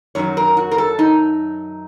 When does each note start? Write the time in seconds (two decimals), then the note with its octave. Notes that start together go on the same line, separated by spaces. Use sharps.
0.15 F#2 D#3 F#3 C#5
0.37 A#4
0.57 F#4
0.71 A#4
0.78 A4
0.99 D#4